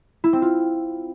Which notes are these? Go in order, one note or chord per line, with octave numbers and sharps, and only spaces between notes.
E4
C4
F4